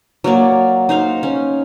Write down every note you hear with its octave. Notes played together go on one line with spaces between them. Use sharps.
F#3 A#3 C#5 D5
D#4 C5 F5
C#4